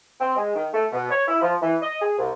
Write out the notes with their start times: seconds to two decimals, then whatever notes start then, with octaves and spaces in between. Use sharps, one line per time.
0.20 C4
0.37 G#3
0.55 D#3
0.73 A3
0.92 B2
1.10 C#5
1.27 E4
1.41 F3
1.62 E3
1.82 D#5
2.02 G#4
2.18 C2